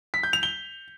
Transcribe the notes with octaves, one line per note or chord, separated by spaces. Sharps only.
B6
G6
F7
G7